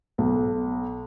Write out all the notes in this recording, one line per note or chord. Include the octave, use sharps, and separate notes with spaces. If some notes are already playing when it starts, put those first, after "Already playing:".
B1